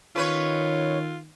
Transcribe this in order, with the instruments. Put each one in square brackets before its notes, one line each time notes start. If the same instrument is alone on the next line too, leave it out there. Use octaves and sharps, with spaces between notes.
[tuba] D#3 [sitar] C#4 B4 C#5 [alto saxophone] F4